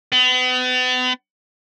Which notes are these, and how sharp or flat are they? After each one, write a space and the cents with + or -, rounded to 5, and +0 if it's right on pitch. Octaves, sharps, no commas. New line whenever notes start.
B3 +40